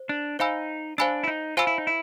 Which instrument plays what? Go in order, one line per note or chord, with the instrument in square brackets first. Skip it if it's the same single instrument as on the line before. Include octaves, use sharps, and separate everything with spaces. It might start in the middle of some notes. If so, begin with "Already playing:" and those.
Already playing: [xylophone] C5
[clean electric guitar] D4
[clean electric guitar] D#4 [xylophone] C5 F5 G#5 B5 E6
[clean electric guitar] D4 [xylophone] C5 F5 G#5 B5 E6
[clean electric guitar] E4
D#4
[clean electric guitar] F4 [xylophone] C5 F5 G#5 B5 E6
[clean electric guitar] E4
D#4
E4